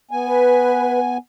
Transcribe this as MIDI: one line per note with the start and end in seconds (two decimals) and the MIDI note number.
0.11 1.17 59
0.11 1.17 80
0.26 0.99 71